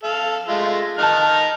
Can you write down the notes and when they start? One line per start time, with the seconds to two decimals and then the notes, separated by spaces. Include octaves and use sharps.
0.04 A4 F5
0.48 G#3 A3 F4
0.98 D#3 D#4 A5 F6 F#6